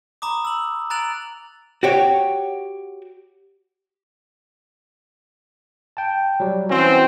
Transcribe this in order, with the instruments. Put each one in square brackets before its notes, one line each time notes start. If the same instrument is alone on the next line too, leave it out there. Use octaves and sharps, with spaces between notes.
[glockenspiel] A#5 B5 D6 D#6
E6 F#7
A#5 F#6 A6 D7 F7 F#7
[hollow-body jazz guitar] F#4 G4 C#5
[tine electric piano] G5 A5
F#3 G3
[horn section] E3 C4 [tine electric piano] C#4 F#4